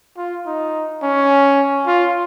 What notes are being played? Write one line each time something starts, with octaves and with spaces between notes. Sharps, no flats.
F4
D#4
C#4
F4